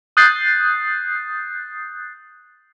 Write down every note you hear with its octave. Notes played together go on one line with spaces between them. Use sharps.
D#6 F#6 G6 A6 C7